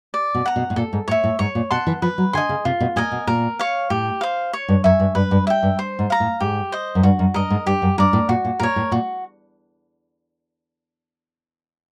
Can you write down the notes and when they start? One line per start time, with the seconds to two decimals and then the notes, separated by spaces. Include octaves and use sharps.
0.14 D5
0.35 B2
0.46 F#5 A#5
0.56 B2
0.70 A2
0.76 A#2 A4
0.93 G#2
1.08 A2 C#5
1.11 E5
1.24 A2
1.39 G#2 C#5
1.55 A#2
1.71 B2 F#5 A5 C6
1.87 E3
2.02 F3 B4
2.18 F#3
2.33 D3 D#5 G#5 C6
2.49 C#3
2.65 C3 F4
2.80 B2
2.96 A#2 A#4 D#5 G#5
3.12 B2
3.27 A#2 A#4
3.59 C#5 F5
3.90 A2 G4
4.21 C5 F5
4.53 C#5
4.68 G2
4.84 F#2 E5 G#5 C#6
4.99 G2
5.15 G2 B4
5.31 G2
5.47 E5 G5
5.63 G2
5.79 C5
5.99 G#2
6.10 F5 A#5
6.20 A2
6.40 G#2 G4
6.72 C5 D#5
6.95 F#2
7.03 G2 F#4
7.19 F#2
7.34 G2 A#4 D#5
7.50 G#2
7.66 G2 G4
7.82 F#2
7.98 G2 A#4 D5
8.13 A2
8.29 A#2 F#4
8.45 A#2
8.60 A#2 A#4
8.63 C#5
8.76 A2
8.91 A#2 F#4